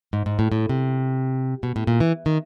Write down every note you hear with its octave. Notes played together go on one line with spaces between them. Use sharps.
G#2
G#2
A2
A2
C3
B2
A2
A#2
E3
D#3